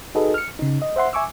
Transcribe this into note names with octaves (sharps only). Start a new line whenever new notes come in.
D#4 F#4 G#4 A4 B4 D#5
F6 C#7
C#3 D#4
D#5
C5 E5 F#5 C6
E5 G#5 C#6 D6 E6